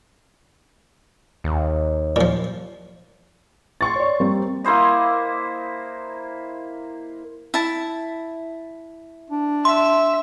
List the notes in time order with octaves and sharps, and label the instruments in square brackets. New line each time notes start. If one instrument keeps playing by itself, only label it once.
[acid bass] D#2
[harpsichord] A#2 F3
[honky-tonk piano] C6 C#6 A6
[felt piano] C#5 D5
G3 A#3 C4
[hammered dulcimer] A#3 E4 C5 D#5
[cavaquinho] E4 A5
[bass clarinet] D4
[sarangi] E5 [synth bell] C6